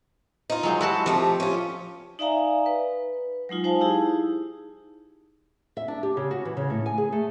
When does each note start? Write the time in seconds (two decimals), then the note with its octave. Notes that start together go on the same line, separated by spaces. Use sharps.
0.50 D#4 F4
0.63 F#3 G#3 C5
0.81 G2 E4 F#4 A5
1.06 C3 F3 A3 G4
1.40 C#4 F4
2.19 D#4 D5 E5 F5 G#5 A#5
2.66 B4
3.49 F#3 G#3 D#4 F4
3.64 D#4 C5 F5 G#5 A5
3.81 D#4 E4 G4 G#4
5.77 E5
5.88 D4
6.03 G4
6.17 C#3
6.31 F#4
6.45 E3
6.57 C#3
6.70 A2
6.86 G#5
6.98 G#4
7.12 A3